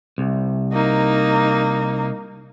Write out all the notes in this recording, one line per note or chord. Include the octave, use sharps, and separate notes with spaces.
C2
A#3 D#4